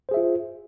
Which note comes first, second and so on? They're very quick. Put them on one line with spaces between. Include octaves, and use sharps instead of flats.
C5 G#4 E5 F4